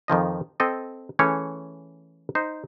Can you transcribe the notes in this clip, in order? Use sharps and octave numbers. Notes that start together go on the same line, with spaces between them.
F2 D#3 F3 D#5
C4 A4 D#5
E3 A3 C#4 G#4 C#5
D#4 C5